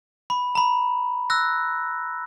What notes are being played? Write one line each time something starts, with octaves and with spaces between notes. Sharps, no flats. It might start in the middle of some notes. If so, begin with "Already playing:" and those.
B5
A#5 B5
E6 F#6 A#6